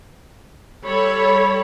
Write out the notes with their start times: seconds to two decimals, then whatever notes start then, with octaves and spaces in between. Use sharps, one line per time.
0.84 G3 A4 C#5 B5